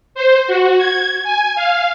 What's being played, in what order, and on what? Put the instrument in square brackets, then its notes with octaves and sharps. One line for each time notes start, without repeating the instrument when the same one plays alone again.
[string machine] C5
F#4
G#6
G#5
F5